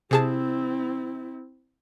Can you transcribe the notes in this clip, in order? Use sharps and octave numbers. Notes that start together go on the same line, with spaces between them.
C3 C4 E4 G#4 A5